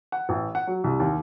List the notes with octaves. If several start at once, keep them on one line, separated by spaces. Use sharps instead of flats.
F#5
A1
F#5
F#3
C2
D#2